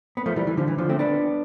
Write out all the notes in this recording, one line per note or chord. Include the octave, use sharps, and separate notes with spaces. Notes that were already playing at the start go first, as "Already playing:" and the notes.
B3
F3 A3
E3 G3
E3
D3 F3
E3
D3 F3
A3 C4
B3 D4